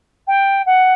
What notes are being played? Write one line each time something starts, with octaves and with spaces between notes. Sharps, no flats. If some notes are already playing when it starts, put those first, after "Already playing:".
G5
F#5